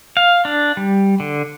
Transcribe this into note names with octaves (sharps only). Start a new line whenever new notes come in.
F5
D4
G3
D3